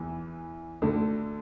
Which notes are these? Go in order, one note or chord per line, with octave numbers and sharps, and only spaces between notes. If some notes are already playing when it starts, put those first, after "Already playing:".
Already playing: E2 E3
D2 D3